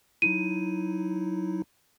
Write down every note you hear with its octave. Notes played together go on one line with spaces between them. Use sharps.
F#3 D#4 E4 D#7